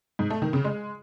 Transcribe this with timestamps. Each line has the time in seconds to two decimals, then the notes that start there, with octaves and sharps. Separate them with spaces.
0.19 G#2
0.30 A3
0.42 D#3
0.53 C#3
0.64 G#3